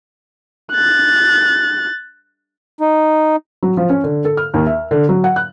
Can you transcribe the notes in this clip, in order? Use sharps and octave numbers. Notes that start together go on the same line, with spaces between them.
F#6 A6
D#4
F#3
F3
C#4
D3
A4
F6
D#2
E5
D3
F#3
F#5
F#6